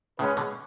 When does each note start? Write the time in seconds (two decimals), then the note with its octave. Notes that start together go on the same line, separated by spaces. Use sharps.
0.19 A2 C#3 G#3 C#4 G#4 B4
0.37 B2 D3